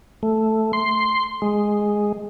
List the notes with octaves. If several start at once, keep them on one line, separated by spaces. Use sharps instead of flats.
A3
C6
G#3